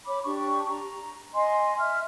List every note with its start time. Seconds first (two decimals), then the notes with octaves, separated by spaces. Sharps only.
0.05 C#5 B5 D6
0.24 D4 G4 C#6
0.69 A#5
1.34 D#5 G#5 C6
1.78 E5 F6